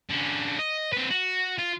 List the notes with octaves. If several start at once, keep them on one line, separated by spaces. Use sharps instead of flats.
D3 C#4
D#5
C4 B4
F#4
F4